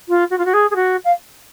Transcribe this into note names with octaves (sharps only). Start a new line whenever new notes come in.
F4
F#4
F4
F#4
G#4
G#4
F#4
F5